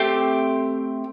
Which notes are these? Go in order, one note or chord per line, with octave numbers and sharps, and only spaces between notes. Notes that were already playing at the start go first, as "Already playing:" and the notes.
Already playing: A3 C4 G4